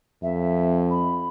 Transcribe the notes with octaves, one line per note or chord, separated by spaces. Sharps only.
F2 E5
B5